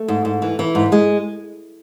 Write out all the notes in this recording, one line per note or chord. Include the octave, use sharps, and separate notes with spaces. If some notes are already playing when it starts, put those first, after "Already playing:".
Already playing: A3
G#2
G#2
E3
E3
G#2
G#3